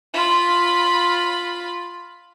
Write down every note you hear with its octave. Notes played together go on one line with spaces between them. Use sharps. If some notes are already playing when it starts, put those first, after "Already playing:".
F4 B5